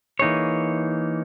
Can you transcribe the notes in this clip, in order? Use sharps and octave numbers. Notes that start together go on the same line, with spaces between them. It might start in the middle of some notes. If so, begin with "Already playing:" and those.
E3 A#3 D#4 G#4 C#5